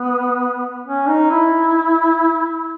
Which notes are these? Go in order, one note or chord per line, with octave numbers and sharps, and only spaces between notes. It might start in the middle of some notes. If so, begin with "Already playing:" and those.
Already playing: B3
C#4
D#4
E4